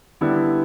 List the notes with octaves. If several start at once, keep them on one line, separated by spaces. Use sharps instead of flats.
D3 G3 B3 E4